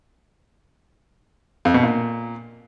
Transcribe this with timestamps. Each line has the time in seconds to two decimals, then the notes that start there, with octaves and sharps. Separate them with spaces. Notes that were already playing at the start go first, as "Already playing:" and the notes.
1.65 F2
1.74 B2
1.83 A#2